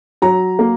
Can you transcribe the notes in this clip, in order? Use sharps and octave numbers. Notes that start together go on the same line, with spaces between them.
F#3 A#5
A#3